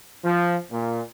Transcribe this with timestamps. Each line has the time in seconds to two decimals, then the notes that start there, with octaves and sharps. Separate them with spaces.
0.25 F3
0.71 A#2